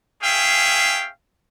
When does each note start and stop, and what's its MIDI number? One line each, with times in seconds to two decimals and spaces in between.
0.22 1.08 61
0.22 1.08 68
0.22 1.08 76
0.22 1.08 77
0.22 1.08 79